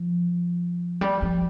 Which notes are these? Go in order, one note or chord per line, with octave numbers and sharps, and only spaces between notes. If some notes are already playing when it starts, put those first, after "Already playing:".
Already playing: F3
G3
F3